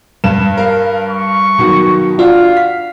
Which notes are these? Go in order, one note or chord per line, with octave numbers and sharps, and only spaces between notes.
G2 E7
A#4 F5
C#6
B2 D#3 F#3
D4 F4 F#4 F5
B6